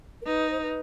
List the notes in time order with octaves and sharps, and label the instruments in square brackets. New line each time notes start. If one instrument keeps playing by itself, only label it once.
[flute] A#4
[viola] D#4 [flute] B4
[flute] C5
B4